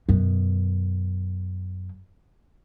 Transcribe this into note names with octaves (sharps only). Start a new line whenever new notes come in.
F#2 B2